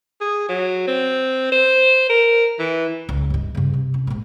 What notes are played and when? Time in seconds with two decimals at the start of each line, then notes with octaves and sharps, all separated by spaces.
0.21 G#4
0.49 F#3
0.87 C4
1.52 C5
2.09 A#4
2.59 E3
3.09 C#2
3.30 G2 D#4
3.55 G2 C#3
3.73 C3
3.94 C#4
4.07 A#1 G#2